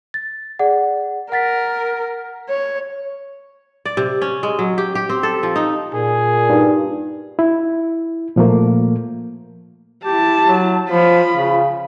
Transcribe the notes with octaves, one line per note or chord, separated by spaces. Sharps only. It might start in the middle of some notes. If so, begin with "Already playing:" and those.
A6
G#4 D5 F#5
A#4 F#5 A6 B6
C#5
D5
C3
C#4
G#3
F#3
G4
G4
C4
A4
F3
D#4
A#2 G#4
G2 D#4
E4
A#2 F3 A3 A#3
E4 G4 A5
F#3
F3 F4 B5
C#3